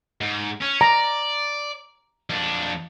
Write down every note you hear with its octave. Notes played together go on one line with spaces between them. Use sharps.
G#2
C#4
D5 A#5
F2 D4